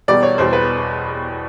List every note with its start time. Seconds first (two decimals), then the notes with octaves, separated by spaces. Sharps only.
0.08 E1 E2 B2 G3 D5
0.23 C#5
0.38 E1 E2 B2 G3 C5
0.53 B4